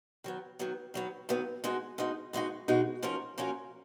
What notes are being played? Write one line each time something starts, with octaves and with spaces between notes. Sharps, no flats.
D#3 F#3 B3
D#3 F#3 B3
D#3 F#3 B3
D#3 F#3 B3
B2 G#3 D#4 F#4
B2 G#3 D#4 F#4
B2 G#3 D#4 F#4
B2 G#3 D#4 F#4
F3 A#3 C#4 F#4 A#4
F3 A#3 C#4 F#4 A#4